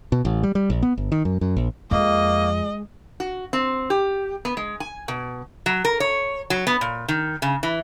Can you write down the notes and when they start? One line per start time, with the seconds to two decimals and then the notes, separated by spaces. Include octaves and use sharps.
0.12 B2
0.25 A1
0.43 G3
0.55 G3
0.70 A#1
0.82 B3
0.98 G1
1.12 D#3
1.25 F#2
1.41 F#2
1.57 A#1
1.91 F2 G#3 A#3 D#5
3.20 F#4
3.53 C4
3.90 G4
4.45 B3
4.57 G#3
4.80 G#5
5.08 B2
5.66 F#3
5.85 A#4
6.00 C#5
6.50 F#3
6.67 B3
6.81 A#2
7.08 D#3
7.42 C#3
7.63 E3